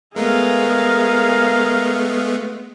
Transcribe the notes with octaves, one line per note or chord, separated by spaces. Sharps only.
G#3 A3 B3 G#4 A#4 F5